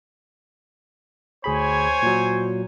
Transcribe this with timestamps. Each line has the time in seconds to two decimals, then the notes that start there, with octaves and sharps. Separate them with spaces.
1.44 D2 G#4 C5 C#5 G#5 B5
2.02 A#2 F#3